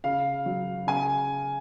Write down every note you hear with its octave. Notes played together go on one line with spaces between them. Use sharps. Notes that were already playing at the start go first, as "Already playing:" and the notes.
C#3 F5
F#3
C#3 G#5